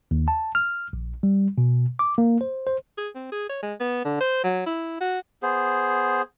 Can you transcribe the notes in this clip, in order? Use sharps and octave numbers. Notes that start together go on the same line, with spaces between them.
D#2
A5
F6
A#1
G3
B2
D6
A#3
C5
C5
G#4
C4
G#4
C#5
G#3
B3
D3
C5
F#3
E4
F#4
B3 G#4 C5